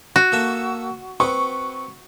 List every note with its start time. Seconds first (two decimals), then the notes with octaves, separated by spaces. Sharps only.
0.16 F#4
0.32 A#3 A4 E5
1.20 C4 B4 C#6